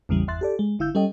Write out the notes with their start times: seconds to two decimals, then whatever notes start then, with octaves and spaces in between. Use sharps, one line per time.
0.09 A1 E2 C#3 E3 G3
0.28 G1 E2 E5 C6 F#6 A6
0.41 G4 A4 D5
0.59 G#3
0.79 G1 D3 E4 F5 E6 G6
0.95 G3 C#4 A4 D#5 G5